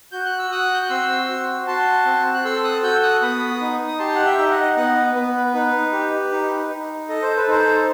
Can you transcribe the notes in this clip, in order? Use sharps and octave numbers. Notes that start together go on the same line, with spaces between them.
F#4 G6
F#6
E6
F#4 D#6 F#6
G6
F#6
C4 C6 E6
F#4
F#4 A5 C6
C4
F#6
A4 C6 E6
D#6 F#6
F#4 E6 G6
D#6 F#6
B3 B5 D#6
D#4
D#6
G4 A5 C6
F#5
E5 G5
D#4
D#5 F#5
B3 D#5 F#5
B3 B4
D#4 B4
G4
D#4
D#4
A4 D#5
C5
B4
D#4 A4 C5